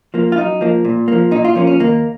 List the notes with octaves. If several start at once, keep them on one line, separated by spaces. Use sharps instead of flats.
F3 A#3
F4
F#2 D#4
F3 A#3
A#2
F3 A#3
A#2 D#4
F4
F3 A#3 C#4
C#4
D#2 A#3